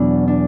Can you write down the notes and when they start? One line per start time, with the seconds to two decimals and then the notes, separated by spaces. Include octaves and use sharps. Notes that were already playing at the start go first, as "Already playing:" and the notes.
Already playing: E2 B2 F#3 D4 E4
0.27 D4